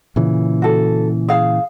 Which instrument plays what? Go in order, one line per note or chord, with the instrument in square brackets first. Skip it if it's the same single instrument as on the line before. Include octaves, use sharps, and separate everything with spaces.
[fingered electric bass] A#2 C#3 E3
[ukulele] F#4 A4
G#4 F5